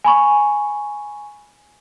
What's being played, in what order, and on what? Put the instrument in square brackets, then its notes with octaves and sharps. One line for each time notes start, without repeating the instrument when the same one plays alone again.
[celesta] G#5 B5 C#6